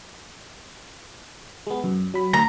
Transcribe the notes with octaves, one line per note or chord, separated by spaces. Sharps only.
G#3 B3
F#2
F#3 B5
D2 A#5